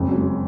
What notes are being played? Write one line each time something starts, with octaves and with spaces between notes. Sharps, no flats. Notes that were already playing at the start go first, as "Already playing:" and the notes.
Already playing: F#1 F2 C#3 G#3
F#3
G#3